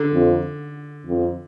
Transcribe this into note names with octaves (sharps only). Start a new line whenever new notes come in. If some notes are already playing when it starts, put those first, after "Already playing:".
Already playing: D3
F2
F2